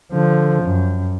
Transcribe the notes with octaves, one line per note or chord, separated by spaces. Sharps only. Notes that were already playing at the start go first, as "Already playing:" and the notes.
D3 F3
F#2